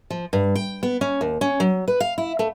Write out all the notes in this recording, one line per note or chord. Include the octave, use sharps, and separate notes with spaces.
F3
G2
G5
B3
C#4
D#2
C#4
F#3
B4
F5
E4
A3